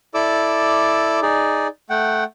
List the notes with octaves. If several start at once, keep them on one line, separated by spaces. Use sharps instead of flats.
E4 A4 D5 D6 E6
D#4 G#4 D5
A3 F#5 G5